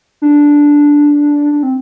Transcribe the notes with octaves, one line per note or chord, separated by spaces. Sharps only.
D4
D4
C4